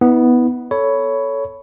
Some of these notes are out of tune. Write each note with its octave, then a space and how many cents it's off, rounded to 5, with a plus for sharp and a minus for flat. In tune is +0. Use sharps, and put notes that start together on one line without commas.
B3 +0 E4 -45
A4 +0 C#5 +10 B5 +0